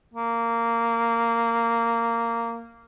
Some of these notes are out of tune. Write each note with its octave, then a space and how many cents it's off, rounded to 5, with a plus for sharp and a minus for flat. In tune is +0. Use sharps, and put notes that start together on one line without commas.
A#3 -10